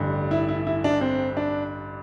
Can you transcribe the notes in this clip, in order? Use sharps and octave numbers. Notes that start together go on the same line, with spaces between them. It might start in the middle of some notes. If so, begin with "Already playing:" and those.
Already playing: A1 G2 D3
E4
E4
E4
D4
C4
D4